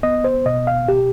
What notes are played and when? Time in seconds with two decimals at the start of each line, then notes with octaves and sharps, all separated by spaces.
0.03 B3 D#5
0.24 C5
0.46 B2 D#5
0.67 F5
0.88 B2 G4